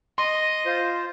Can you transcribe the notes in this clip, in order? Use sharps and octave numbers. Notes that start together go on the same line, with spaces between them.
D#5 C6
F4 C5